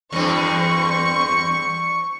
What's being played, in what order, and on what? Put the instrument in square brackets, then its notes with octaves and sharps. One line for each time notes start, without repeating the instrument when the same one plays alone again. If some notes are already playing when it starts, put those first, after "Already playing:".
[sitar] E2 G2 C4 [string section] C#6